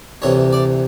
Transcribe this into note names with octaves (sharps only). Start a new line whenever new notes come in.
D2 C3 E3 C#5
D5